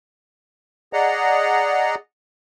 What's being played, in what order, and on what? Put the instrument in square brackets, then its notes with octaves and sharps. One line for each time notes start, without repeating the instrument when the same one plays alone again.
[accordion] G#4 D5 D#5 F#5 A#5